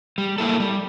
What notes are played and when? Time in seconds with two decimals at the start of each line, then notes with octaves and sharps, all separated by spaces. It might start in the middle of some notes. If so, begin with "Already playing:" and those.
0.18 G3
0.38 A#3 E4 A4
0.60 G3